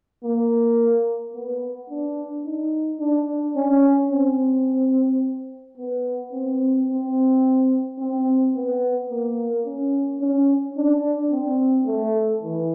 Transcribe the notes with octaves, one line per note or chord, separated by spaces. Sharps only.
A#3
B3
D4
D#4
D4
C#4
C4
B3
C4
C4
C4
B3
A#3
C#4
C#4
D4
C4
A3
E3